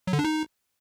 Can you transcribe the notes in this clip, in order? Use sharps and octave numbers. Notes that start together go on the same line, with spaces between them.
F#3
D3
D4
D#4